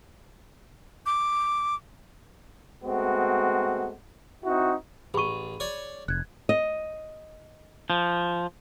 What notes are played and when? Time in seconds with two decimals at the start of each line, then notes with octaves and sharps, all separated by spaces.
1.06 D6
2.83 G#3 A3 B3 C4 F#4
4.44 C4 D#4 E4 F#4
5.14 A1 G#4 B5 C#6 D#7
5.60 C#5 D5
6.08 F1 F#6 G#6
6.49 D#5
7.90 F3